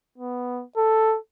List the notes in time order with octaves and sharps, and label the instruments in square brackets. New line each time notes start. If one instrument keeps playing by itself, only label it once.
[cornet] B3
A4